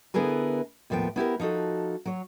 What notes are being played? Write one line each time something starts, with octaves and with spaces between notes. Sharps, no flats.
D3 B3 E4 G#4 A#4 B4
D#2 A2 F3 B3 G5
B3 E4 G4 A#4
F3 D#4 F#4 A4
F#3 C#5